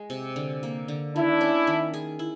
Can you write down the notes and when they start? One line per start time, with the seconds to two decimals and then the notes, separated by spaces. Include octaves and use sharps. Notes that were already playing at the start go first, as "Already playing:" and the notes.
Already playing: G#3
0.10 C3
0.36 D3
0.63 A#3
0.88 D3
1.15 D#3 D4 E4
1.41 C#4
1.67 D#3
1.94 G#4
2.19 E4